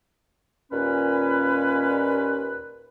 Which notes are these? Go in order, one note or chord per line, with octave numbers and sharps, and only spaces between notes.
D#2 A#2 C#4 B4